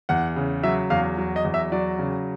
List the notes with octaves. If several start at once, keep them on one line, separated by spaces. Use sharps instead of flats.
E2 F#5
C#3
F#3 E5
E2 F5
F#3
D#5
E2
E5
F#3 D5
C#3